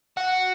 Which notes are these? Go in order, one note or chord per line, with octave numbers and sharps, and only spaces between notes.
F#4